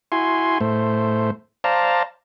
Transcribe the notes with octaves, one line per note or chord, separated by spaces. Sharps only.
E4 F#4 G#5 C6
A2 A3 C5
C5 D5 F5 A5 A#5